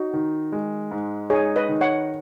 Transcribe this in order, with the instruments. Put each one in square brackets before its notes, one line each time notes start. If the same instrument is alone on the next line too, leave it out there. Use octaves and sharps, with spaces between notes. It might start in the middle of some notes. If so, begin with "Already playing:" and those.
Already playing: [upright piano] D#4 [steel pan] F#4
[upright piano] D#3
G#3
G#2
[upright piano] D#4 [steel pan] G#4 C#5
[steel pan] B4 D#5
[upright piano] D#3
[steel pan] C#5 F#5